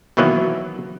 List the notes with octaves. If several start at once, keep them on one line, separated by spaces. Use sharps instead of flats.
B2 D#3 E3 F#3 A#3 B3